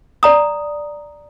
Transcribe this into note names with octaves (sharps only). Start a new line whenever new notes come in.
D5 A#5 D#6